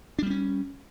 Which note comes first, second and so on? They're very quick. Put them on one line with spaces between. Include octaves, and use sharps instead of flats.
D4 G3 B3 C#4